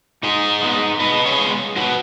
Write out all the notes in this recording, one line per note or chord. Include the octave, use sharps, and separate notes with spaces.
G#2 D#4 G#4
G#3 B3
G#2 B4 D#5
G#4 C#5
G#3 B3
G#2 F#4 B4